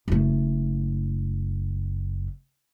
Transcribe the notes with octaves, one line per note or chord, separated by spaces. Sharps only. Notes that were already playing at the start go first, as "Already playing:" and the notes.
F#1 A3